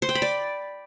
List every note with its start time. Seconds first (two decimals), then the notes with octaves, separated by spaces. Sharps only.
0.02 C5
0.09 G5
0.15 B5
0.22 D5